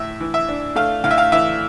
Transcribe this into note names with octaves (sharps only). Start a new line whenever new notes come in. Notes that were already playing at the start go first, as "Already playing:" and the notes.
Already playing: A2 E5
E3
E5
D4
A3 F5
A2 F5
E5
F5
E3 E5